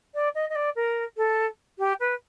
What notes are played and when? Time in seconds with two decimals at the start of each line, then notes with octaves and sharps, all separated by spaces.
0.14 D5
0.35 D#5
0.49 D#5
0.55 D5
0.75 A#4
1.17 A4
1.78 G4
2.00 B4